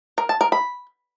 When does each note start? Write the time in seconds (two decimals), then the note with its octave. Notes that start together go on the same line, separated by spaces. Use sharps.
0.18 A#4
0.29 A5
0.41 A#4
0.52 B5